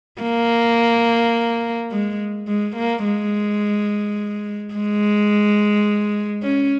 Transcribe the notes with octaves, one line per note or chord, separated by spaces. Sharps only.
A#3
G#3
G#3
A#3
G#3
G#3
C#4